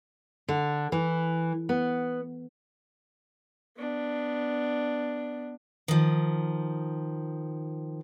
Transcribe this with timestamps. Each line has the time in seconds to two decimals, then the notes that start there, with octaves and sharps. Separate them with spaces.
0.48 D3
0.92 E3
1.69 B3
3.77 B3 D4
5.88 D#3 F3